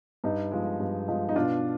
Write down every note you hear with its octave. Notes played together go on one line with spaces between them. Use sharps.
G2 D#4
F3 G#3
G2
F3 G#3
D#4
B2 D4 F4